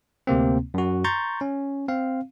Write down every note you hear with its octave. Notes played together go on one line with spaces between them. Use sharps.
D2 C3 A#3 C4
F#2 F#4
A#5 C6 C#6 G6 A6
C#4
C4 F5